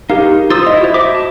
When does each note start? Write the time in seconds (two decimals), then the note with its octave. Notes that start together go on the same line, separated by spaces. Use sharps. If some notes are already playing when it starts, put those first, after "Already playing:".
0.10 D#4 G4 A#4 F5
0.50 F4 C5 C6 D#6 E6 A6
0.67 E4 D#5
0.81 F#4 C5
0.94 D#5 E5 D6
1.15 A5